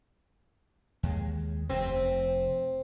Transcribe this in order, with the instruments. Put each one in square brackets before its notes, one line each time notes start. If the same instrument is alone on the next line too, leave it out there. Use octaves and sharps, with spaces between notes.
[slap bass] D#2 G#3
[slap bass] F1 C3 [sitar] C4